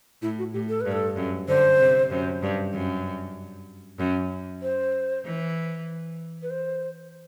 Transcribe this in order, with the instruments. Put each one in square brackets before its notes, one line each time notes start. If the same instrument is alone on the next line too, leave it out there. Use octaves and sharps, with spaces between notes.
[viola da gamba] A2 [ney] E4
[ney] F#4
[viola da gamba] A2 [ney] G4
[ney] A4
[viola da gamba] G2 [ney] B4
[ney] A4
[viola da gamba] F#2
[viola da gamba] D3 [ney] C5
[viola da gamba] C3
F#2
G2
F#2
F#2
[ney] C5
[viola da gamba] E3
[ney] B4
C5